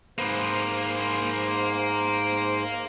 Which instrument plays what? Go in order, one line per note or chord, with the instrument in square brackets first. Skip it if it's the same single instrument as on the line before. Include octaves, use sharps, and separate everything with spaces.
[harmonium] G#2 C5 [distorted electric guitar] A#3 B4